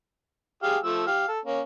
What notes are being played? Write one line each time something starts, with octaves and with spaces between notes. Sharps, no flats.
G4 G#4 F5
F3 A3 E6
G4 F5
A4
A#3 C#4